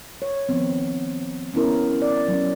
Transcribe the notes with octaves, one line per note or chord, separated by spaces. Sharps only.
C#5
D3 D#3 F3 B3 C4
B3 C#4 E4 A#4
D5
F#3 C#4